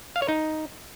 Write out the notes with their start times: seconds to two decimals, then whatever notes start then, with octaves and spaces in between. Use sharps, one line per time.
0.16 F5
0.22 C#5
0.28 D#4